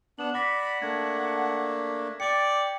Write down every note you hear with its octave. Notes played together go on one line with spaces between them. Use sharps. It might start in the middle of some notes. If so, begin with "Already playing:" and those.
B3 D4 E7 F#7
D5 F#5 B5 D6 A#6 B6
A3 A#3 D4 G#6
D5 G5 D6 C#7